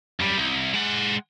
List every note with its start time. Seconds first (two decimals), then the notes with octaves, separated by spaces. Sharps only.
0.20 F#2 G3
0.37 C2
0.73 G#3 F#5